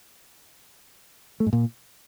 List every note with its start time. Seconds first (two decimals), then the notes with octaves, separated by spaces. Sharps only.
1.40 A3
1.46 G#2
1.53 A#2